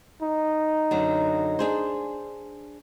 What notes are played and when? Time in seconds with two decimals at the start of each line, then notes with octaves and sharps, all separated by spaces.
0.22 D#4
0.91 F#2 D3 F#3
1.59 D4 G#4 C5